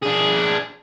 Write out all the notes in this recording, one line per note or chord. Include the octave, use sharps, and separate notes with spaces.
D4 G#4